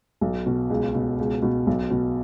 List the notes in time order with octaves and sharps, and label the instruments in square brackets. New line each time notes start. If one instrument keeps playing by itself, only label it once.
[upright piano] B1
B2
C#2
B2
C#2
B2
B1
B2